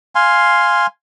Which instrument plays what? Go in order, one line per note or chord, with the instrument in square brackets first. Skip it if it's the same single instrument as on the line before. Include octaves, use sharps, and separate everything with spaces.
[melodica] F5 G#5 C6